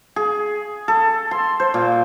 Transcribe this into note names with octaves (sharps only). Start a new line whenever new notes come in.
G#4
A4
C6
C5
A#2